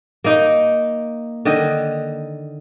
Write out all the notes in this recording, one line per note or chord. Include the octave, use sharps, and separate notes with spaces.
A#3 D#4 D#5
D3 D#3 D#5